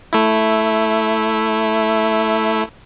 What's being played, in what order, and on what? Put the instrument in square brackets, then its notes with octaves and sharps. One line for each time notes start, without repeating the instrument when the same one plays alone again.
[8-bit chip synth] A3 E4